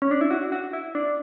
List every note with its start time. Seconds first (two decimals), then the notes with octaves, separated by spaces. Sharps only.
0.02 C#4
0.11 D4
0.21 E4
0.31 F#4
0.52 F#4
0.73 E4
0.95 D4